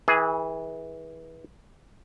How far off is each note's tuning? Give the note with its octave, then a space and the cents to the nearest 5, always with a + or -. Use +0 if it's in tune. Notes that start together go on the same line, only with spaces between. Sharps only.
E3 -25 G#4 +0